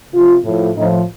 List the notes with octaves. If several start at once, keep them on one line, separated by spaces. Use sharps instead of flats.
C3 F3 F4
A2 F3
A2 F3 D#4